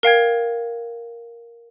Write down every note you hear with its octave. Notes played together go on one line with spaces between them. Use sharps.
A#4 F5 G5 G#6